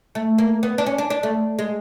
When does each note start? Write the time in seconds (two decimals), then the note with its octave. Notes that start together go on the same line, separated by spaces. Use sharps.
0.15 A3
0.38 A#3
0.63 B3
0.78 D4
0.86 C#4
0.98 D4
1.10 D4
1.23 A3
1.59 G#3